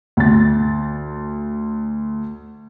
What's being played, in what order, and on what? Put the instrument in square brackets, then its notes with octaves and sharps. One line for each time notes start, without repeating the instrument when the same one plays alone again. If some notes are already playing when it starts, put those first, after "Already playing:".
[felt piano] D2 A6